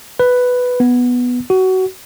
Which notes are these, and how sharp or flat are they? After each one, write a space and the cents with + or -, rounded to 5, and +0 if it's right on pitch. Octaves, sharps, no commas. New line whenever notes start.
B4 +5
B3 +0
F#4 +20